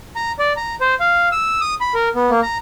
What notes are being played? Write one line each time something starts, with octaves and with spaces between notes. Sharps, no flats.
A#5
D5
A#5
C5
F5
E6
D#6
B5
A#4
B3
A#3
A#5